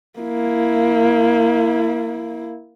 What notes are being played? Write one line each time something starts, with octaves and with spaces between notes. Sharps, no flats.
A#3 E4